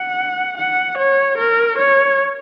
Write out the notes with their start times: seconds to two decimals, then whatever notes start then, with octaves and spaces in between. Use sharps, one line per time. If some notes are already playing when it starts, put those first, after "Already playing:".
Already playing: F#5
0.57 F#5
0.98 C#5
1.38 A#4
1.78 C#5